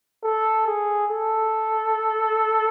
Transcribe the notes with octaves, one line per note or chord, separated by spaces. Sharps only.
A4
G#4
A4